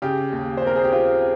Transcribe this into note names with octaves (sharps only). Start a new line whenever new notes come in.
C#3 G4
D#2
C5
C4 A#4
G#4
G4
C4 F4